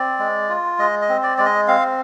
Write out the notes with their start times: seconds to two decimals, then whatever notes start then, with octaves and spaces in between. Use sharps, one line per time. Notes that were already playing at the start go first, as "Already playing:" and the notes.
Already playing: C4 D5
0.19 G#3
0.49 F4
0.79 G#3 D#5
1.02 D#5
1.09 C4
1.23 D5
1.38 G#3 D5
1.45 D#5
1.68 C4 F5